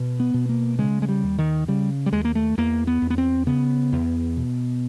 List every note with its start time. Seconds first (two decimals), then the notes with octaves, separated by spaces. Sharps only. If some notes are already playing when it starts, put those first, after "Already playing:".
Already playing: B2
0.20 B3
0.34 B2
0.49 A#3
0.79 C#3 G#3
1.02 G#3
1.09 G3
1.24 D#2
1.38 D#3
1.68 C#3 G3
2.06 G3
2.13 D#2 G#3
2.25 A#3
2.35 A3
2.57 E2 A#3
2.87 B3
3.02 E2
3.10 B3
3.18 C4
3.47 C#3 B3
3.92 E2
4.37 B2